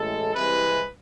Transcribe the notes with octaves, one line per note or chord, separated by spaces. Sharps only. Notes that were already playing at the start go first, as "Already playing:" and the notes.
Already playing: A1 A2 G#3 A4
C2 C3 E3 G#3 B4